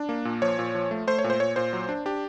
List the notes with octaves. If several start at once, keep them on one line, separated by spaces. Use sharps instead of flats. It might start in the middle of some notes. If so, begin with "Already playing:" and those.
Already playing: D4
A#3
A#2
F3 C#5
A#2
F3
A3
A3 C5
C#5
A#2
C5
A#2 C#5
A#2 C5
F#3
D4
D4 G4